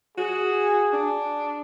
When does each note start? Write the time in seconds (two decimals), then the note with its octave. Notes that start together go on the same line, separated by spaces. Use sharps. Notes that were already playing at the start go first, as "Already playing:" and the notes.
0.18 F#4 G#4
0.93 D4